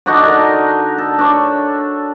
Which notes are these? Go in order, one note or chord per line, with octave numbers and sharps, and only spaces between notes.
D3 D4 D#4 F#4
A#4 G#5
A4
D4 C#5